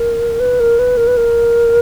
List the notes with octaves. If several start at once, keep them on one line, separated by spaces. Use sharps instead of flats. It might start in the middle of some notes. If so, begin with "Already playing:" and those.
Already playing: A#4
B4
A#4
B4
A#4
B4
A#4